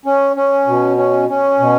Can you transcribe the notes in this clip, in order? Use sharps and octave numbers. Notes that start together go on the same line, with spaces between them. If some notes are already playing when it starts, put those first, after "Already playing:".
C#4
C#4
B2
C#4
C#4
B2